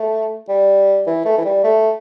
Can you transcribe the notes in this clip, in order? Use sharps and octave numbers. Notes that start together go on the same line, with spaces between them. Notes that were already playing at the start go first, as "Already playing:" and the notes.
Already playing: A3
G3
E3
A3
E3
G3
A3